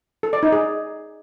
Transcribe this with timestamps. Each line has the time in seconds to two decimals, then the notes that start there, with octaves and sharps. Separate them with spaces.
0.23 A4
0.33 D5
0.43 D#4
0.52 G#4